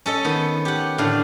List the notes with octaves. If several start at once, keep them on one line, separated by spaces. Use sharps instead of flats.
C#4 A4 D#5
D#3 B3
G4 F#5
A2 D3 F5